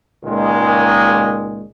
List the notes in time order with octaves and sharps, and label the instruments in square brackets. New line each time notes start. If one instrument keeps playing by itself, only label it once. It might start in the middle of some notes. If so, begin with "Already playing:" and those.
[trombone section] C#2 A#2 D#3 G#3